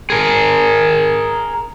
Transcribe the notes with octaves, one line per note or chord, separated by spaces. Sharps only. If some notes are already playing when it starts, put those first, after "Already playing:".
G#4 A#4